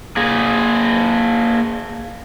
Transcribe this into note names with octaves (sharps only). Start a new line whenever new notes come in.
A#3 G#4